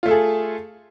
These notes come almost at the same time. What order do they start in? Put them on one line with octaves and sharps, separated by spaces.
F4 A3 A4 G#4